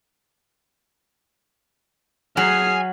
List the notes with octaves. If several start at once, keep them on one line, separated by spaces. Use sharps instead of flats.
F#3 G#4 G#5 F6 C7